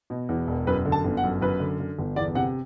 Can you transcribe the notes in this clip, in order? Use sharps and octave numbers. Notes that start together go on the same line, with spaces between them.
B2
E2
E1
F#2 B4
D3
A5
G1
F#5
F#2
F#2 B4
D3
D3
G1
E2 D5
C3 F#5